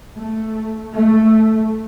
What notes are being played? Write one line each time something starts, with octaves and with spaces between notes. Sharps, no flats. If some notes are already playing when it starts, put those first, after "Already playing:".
A3
A3